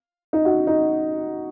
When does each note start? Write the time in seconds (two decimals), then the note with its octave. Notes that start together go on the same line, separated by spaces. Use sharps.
0.33 D#4
0.45 F#4
0.67 D#4